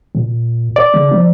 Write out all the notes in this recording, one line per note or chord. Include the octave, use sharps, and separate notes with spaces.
A#2
D5
C#3
F3